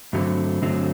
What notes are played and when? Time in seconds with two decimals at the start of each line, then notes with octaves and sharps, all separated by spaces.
0.13 G2 D3 F#3 A3 C4
0.62 G2 D3 F#3 A3 C4